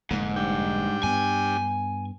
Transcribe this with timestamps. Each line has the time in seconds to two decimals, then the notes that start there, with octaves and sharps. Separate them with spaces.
0.11 F1 G#2 D3 A#3
0.36 G3 D4 G5
1.03 G2 B3 G#5